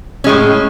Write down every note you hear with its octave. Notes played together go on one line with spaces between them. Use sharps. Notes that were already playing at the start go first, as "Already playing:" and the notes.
A2 G#3 C#4